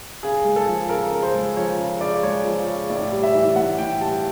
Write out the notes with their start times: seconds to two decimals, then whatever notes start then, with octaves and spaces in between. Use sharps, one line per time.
0.23 C#3 G#4
0.45 G#3
0.56 A4
0.67 F3
0.89 C#3 A#4
1.12 C#3
1.23 C5
1.34 G#3
1.56 F3 C#5
1.78 C#3
2.00 C#3 D5
2.23 G#3 C#5
2.44 F3
2.67 C#3
2.90 A2 D5
3.12 G3
3.23 E5
3.34 E3
3.56 A2 F#5
3.78 A2 G5
4.01 G3 A5